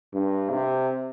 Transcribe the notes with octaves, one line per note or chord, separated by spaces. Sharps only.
G2
C3